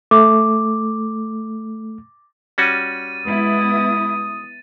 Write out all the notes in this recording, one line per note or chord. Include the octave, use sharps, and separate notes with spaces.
A3 D6
G3 C#4 F#4 A6 D#7
G#3 B3 E4 D#6